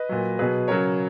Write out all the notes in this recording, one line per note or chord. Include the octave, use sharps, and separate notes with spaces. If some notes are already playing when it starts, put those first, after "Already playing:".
Already playing: B4 D#5
A#2 F#3
B2 F#3 G#4 B4
C#3 F#3 A#4 C#5